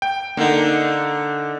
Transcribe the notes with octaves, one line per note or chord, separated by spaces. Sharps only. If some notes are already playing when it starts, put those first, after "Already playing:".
G5
D3 A#3 D#4